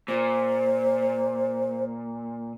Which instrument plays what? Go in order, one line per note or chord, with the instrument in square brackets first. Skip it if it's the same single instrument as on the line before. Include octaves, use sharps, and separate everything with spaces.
[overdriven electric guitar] A#2 [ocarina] C5